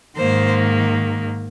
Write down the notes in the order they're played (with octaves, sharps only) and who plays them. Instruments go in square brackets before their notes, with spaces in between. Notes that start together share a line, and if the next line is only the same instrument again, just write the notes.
[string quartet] G#2 D#3 A#3 C5